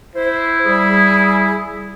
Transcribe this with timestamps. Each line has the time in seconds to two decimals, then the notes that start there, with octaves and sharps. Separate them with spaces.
0.15 E4 C5
0.66 G3 G#4